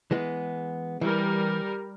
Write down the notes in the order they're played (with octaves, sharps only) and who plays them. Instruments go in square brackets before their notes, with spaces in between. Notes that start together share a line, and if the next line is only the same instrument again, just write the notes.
[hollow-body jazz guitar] E3 G#3 B3
[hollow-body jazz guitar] E3 [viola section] G3 A#4